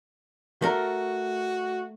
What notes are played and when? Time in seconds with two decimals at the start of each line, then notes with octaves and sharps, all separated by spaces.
0.62 A3 F#4 A#4